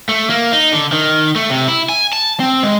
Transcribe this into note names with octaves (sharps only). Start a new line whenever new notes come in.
A3
A#3
D#4
D3
D#3
A3
C3
E4
G#5
A5
C4
G#3